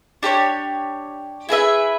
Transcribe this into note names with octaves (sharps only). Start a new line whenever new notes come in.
D4 G4 A#4 C#5
E4 G#4 B4 E5